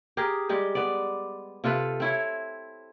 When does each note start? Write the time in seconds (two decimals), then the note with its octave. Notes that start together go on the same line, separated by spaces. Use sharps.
0.17 G4 G#4 A#4
0.49 G3 G#3 G4
0.75 B3 D5
1.64 C3 F4 A4 B4
2.00 C4 E4 C#5